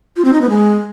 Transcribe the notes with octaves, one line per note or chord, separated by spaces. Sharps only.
F4
C4
D#4
B3
G#3